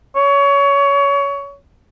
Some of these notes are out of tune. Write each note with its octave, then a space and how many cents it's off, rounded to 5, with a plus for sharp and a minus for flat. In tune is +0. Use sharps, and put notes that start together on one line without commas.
C#5 +25